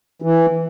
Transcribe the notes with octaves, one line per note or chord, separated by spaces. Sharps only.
E3